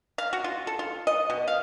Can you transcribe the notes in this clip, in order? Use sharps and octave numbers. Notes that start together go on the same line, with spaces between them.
F5
F#4
F4
A4
F4
D#5
B2
F5